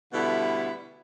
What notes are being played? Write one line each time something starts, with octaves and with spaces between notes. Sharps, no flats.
B2 D3 G3 A3 B3 E4